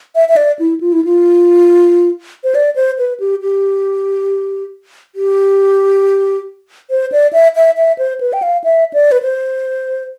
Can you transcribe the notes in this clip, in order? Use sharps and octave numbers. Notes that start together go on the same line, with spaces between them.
E5
E5
D5
E4
F4
E4
F4
C5
D5
C5
B4
G4
G4
G4
C5
D5
E5
E5
E5
C5
B4
G5
F5
E5
D5
B4
C5